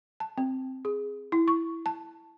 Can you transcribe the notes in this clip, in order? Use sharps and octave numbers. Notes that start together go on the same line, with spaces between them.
A5
C4
G#4
E4
C#6
A5